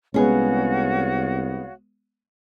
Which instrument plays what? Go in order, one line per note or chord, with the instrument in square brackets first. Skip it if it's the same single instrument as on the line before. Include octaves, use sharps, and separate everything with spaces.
[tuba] C2 [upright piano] G#3 B3 [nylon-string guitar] C#4 G#4 [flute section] F#4 C#5 F5